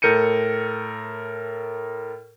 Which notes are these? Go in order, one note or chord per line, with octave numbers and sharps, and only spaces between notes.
A2 A4 A#4 G6 C#7 D#7